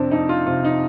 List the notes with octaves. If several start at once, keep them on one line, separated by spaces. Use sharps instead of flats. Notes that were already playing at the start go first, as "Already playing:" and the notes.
Already playing: F2 C3 C4 D4
F2 D#4
F4
C3 F4
D#4